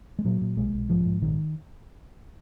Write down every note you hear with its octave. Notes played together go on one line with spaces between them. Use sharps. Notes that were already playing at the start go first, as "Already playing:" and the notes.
G#3
A#2 F#3
A#2
B1 G#3
B1
G#2 F3
G#2
A#1 D#3